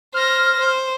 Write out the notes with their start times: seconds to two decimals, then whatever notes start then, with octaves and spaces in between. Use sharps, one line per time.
0.14 C5 F6 A#6
0.59 C5